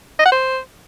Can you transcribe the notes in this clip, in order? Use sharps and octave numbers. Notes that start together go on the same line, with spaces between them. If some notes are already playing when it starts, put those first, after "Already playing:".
D#5
F#5
C5